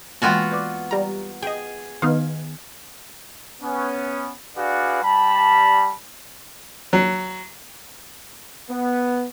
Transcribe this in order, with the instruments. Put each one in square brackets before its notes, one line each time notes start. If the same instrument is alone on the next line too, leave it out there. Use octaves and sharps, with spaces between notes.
[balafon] E3 G#3 A#3 [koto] B3 F4 F#4 [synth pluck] G5 G#5
[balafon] B4 D5 D6
[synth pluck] G3 A#5
[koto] G#4 [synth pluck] D#5 G5
[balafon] D#3 [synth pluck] B3 D#4 F5
[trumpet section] B3 C#4
D4 F#4 G#4 B4 D5 F5
G3 A5 B5
[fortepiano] F#3
[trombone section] B3